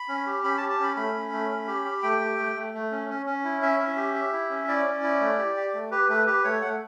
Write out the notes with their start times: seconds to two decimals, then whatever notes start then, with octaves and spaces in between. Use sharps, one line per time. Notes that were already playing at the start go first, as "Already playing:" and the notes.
Already playing: B5
0.09 C#4
0.26 G4
0.44 C#4 B5
0.58 A5
0.62 G4
0.70 A5
0.80 C#4 B5
0.97 A3 B5
1.14 C#4
1.32 A3
1.50 C#4
1.68 G4
1.85 G4
2.03 A3 G5
2.21 G4
2.38 A3
2.55 A3
2.74 A3
2.92 C#4
3.09 C#4
3.26 C#4
3.44 E4
3.62 C#4 E5
3.80 C#4
3.97 G4
4.15 G4
4.33 E4
4.50 C#4
4.68 E4 D5
4.85 C#4
5.03 E4
5.21 A3
5.38 G4
5.57 G4
5.74 A3
5.91 G4 B4
6.09 A3 B4
6.27 G4 B4
6.44 A3 C#5
6.62 A3 F#5